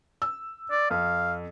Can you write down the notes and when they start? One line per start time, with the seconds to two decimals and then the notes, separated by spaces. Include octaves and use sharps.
0.22 E6
0.71 D5
0.91 F2 F5